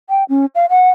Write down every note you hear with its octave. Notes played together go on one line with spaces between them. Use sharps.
G5
C#4
F5
F#5